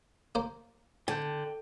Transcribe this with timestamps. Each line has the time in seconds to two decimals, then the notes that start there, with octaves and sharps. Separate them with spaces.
0.35 A#3 C5
1.08 D3 G5 A5 G6